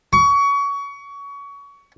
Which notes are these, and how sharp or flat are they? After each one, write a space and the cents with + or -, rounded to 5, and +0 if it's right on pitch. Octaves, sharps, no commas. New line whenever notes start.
C#6 +25